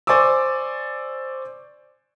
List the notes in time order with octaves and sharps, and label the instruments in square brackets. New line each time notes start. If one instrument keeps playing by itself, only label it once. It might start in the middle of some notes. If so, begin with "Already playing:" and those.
[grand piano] C5 D5 G#5 C#6 D6 E6